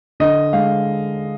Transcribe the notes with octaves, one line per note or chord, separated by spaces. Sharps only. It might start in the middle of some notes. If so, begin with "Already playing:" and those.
D3 D#5
G#3 F5